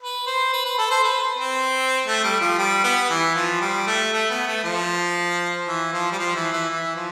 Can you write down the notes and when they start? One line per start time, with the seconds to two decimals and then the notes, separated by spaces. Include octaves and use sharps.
0.01 B4
0.27 C5
0.53 B4
0.65 B4
0.78 A4
0.91 C5
1.04 B4
1.38 C4
2.07 A3
2.24 G3
2.41 F3
2.58 G3
2.84 B3
3.10 E3
3.35 F3
3.61 G3
3.87 A3
4.13 A3
4.30 B3
4.48 A3
4.64 F3
5.67 E3
5.93 F3
6.12 G3
6.19 F3
6.35 E3
6.52 E3
6.70 E3
6.96 F3